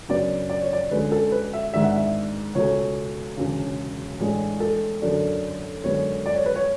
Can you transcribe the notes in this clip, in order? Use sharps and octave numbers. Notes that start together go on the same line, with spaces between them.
F#2 C#3 F#3 B3 D4 D5
D5
C#5
D5
D2 D3 G#3 C#4 B4
A4
B4
E5
G#1 G#2 G#3 D4 E5
F#5
E5
C#2 B2 A3 C#4 C#5
E1 D2 C#3
A1 A2 G#3 D4
A4
F#2 D3 A3 D4
F#2 D3 G#3 B3 C#5
D5
C#5
B4
C#5